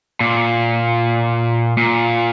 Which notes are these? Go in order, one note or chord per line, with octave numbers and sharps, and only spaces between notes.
A#2
A#2